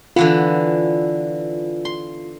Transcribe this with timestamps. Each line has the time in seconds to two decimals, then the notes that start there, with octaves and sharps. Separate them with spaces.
0.16 D3 E3 B3 F4
1.85 C6